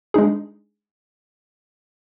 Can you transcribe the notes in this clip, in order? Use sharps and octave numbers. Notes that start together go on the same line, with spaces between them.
G#3 D4 D#4 G#4